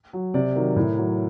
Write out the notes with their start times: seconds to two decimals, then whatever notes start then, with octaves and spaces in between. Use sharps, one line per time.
0.13 F#3
0.34 C3 D5
0.55 D#3 F#3 A#4
0.76 A2
0.98 F#3